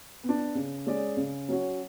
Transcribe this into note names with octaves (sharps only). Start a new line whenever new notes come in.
B3
D4
C#3
G#3 C#4 G#4 D5
C#3
F#3 C#4 F#4